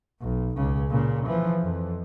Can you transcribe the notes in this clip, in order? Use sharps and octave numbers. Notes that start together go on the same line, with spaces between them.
B1
C#2 C#3
A#2 C#3
E3 F3
F2